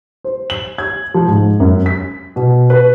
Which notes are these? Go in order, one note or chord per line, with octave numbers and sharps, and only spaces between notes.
C5
F#7
G#6
F3
G#2
F#2
B6
B2
B4